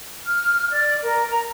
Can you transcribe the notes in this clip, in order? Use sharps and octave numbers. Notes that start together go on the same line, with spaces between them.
F6
D5
A#4
A#5